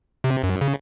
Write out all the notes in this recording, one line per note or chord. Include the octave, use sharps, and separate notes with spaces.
C3
F#2
C#3